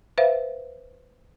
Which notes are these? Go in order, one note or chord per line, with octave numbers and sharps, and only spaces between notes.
B4 C5 E5 F5